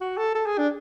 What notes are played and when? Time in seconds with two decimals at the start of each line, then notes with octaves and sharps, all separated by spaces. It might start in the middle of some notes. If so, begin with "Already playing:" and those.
0.01 F#4
0.18 A4
0.35 A4
0.46 G#4
0.58 D4